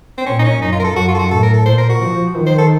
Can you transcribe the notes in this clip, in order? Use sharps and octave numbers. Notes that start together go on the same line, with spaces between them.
C4
A#2 C#4
D#4
C#4
F#2 D#4
F4
A#4
A4
F#2 F#4
F4
A4
F#4
A2 A4
A#4
A4
A#2 C5
A#4
F#4
F3
D#3
C5
A4